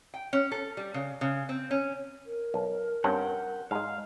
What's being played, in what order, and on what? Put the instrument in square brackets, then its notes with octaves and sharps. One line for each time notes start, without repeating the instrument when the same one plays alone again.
[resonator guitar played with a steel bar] G5
C#4
A4
G3
C#3
C#3
C4
C#4
[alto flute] A#4
[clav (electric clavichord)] B1
[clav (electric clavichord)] G2 C4 C#4 [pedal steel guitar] F#5 G5
[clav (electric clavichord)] G#2 G#3 [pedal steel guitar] F5